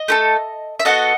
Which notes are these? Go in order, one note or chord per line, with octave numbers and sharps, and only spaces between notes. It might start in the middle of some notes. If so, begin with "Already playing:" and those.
Already playing: D#5
A3 E4 A4
E5
B3 F#4 A4 D#5 F#5